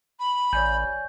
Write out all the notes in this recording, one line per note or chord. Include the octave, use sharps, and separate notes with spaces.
B5
A1 C#5 D5 G#5 G6